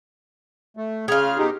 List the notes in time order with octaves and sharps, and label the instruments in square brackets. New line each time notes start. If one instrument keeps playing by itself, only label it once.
[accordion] A3
[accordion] C#3 F6 [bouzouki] F4 G#4
[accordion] B2 D#4 G4